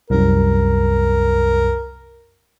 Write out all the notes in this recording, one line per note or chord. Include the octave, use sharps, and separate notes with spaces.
C2 F#2 A#4